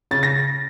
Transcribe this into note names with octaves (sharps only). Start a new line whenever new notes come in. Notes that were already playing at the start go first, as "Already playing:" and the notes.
C#3 A6
A#6